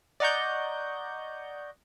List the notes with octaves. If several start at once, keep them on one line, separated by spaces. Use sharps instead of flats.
D5 D#5 F#5 A#5 C#6 G6